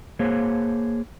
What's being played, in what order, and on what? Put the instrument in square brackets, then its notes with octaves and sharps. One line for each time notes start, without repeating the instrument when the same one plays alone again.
[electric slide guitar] A#3 G#4 C5 C#5